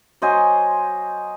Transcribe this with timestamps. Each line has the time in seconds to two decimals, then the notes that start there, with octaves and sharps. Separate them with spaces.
0.22 F#3 C5 D#5 G#5